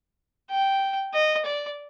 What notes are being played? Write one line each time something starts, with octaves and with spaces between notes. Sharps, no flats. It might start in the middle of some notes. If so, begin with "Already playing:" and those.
G5
D#5
D5